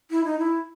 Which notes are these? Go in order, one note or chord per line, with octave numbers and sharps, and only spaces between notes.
E4
D#4
E4